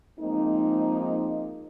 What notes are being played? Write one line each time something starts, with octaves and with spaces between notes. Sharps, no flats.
F3 G#3 A#3 C4 D#4